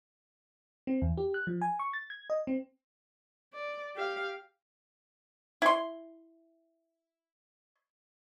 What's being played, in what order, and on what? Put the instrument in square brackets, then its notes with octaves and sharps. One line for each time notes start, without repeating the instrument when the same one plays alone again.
[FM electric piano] C4
E2
G4
F#6
F3
G#5
C#6
A6
G#6
D#5
C4
[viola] D5
G4 F5
[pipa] E4 C6